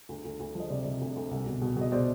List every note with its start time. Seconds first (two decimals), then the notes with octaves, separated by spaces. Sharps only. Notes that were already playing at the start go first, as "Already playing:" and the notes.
0.09 D2
0.25 D2
0.40 D2
0.55 F3 D#5
0.70 C3 C5 D5
0.85 C3
1.01 D2
1.16 D2
1.31 C2
1.46 B2
1.62 B2
1.76 B2 D#5
1.92 B2 C5 D5